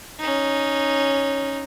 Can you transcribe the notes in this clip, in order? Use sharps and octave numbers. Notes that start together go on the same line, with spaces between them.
C#4 D#4